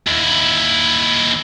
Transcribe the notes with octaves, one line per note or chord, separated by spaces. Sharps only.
D#2 E4